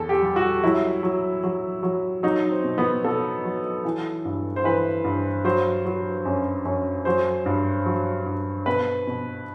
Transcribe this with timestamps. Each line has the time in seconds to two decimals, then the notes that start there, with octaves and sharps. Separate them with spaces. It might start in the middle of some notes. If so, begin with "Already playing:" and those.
Already playing: E2 A4
0.09 G4
0.22 G3
0.36 F#4
0.63 F#3 E4
1.03 F#3
1.43 F#3
1.83 F#3
2.23 F#3 D#4
2.51 C4
2.64 B2
2.78 B3
3.04 B2 A4
3.45 F#3
3.85 E3
4.25 G2
4.56 C5
4.64 E3 B4
5.04 G2
5.44 F#3 C5
5.85 F#3
6.25 F#2
6.65 F#2
7.05 F#3 C5
7.46 G2
7.86 F#3
8.26 G2
8.66 B2 B4
9.07 B2